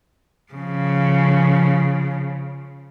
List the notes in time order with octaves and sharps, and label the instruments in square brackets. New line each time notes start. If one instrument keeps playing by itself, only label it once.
[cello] C#3 F3